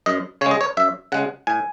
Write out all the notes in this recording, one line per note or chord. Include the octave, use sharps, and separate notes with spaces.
F#2 D#5
C#3 G#3 C#5
D#5
C#5
F#2 E5
C#3 G#3 F#5
A2 G#5